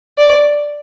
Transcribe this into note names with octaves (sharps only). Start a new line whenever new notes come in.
D5